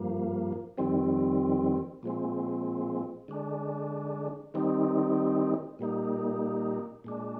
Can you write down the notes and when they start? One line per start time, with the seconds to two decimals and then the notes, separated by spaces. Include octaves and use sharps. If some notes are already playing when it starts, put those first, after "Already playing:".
Already playing: G2 F3 A#3
0.78 F2 D#3 G3 C4
2.03 A#2 F3 G#3 C4
3.28 D3 G#3 D4
4.54 D#3 G3 C4 D#4
5.79 A#2 G3 A#3 D#4
7.04 A#2 G#3 D4